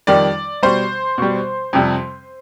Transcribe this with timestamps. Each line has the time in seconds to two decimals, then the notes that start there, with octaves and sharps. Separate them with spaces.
0.07 F2 D#3 G3 D5
0.63 B2 G3 C5
1.18 B2 G3
1.73 F2 C3 G3